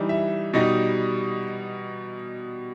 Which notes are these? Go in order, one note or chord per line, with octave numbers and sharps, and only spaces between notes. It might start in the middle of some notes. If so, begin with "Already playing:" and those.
Already playing: E3 G3 D#4
E5
B2 G3 D#4 D#5